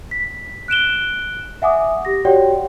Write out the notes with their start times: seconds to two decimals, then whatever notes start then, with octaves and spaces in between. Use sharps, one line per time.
0.11 B6
0.68 F#6 D7 E7 G7
1.62 E5 F#5 G#5 D6 D#6
2.05 G4 A#6
2.25 F#4 G4 C#5 D5 F#5 G5